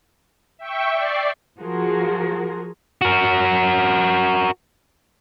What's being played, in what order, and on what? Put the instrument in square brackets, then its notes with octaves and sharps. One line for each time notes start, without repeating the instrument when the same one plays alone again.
[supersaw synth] E5 G5 C#6
D5 C7
[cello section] F3 F4 F#4 G#4 A#4
[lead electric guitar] F#4 A#4